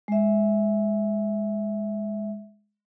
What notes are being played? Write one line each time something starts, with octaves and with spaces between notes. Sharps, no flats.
G#3 E5